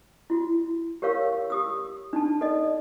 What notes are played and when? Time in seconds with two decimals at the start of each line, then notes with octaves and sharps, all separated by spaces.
0.30 E4 F#4
1.02 G4 A#4 C#5 F5 C#6 E6
1.50 G4 D#6 E6
2.13 D4 D#4 A5
2.41 A4 D5 D#5